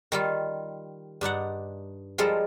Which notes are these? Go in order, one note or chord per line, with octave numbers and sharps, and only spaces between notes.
D#3 G3 F4
G2 D4 D#4 F#5
F3 G3 G#3 A4 A#4